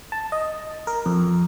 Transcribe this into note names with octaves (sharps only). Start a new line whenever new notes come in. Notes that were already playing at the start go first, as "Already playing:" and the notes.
A5
D#5
A#4
F2